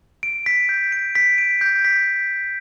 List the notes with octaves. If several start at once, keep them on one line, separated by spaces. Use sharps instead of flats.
D7
B6
G6
D7
B6
D7
G6
B6